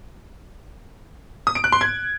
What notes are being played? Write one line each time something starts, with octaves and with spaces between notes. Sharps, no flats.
D#6
D7
F#6
C6
G#6